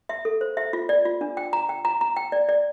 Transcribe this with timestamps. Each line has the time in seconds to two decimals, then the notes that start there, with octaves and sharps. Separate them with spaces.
0.09 E5
0.25 A4
0.41 C5
0.57 E5
0.73 F4
0.89 D5
1.05 F4
1.21 D4
1.37 G5
1.53 A#5
1.69 G5
1.85 A#5
2.01 A#5
2.16 G5
2.32 D5
2.49 D5